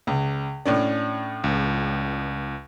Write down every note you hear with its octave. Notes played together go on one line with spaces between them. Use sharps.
C#2
A2 C#4 D4
C#2